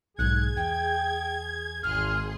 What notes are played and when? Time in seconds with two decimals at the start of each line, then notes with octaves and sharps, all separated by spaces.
0.18 B1 G#2 G#4 F#6 G#6
0.56 E2 G5
1.83 G#1 G#4 C6 F6